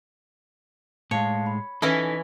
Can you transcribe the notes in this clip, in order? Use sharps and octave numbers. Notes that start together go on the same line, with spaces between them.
A2 G#3 C#5 F5 A5
B5
E3 C#4 D#4 E4 A4 A#6 B6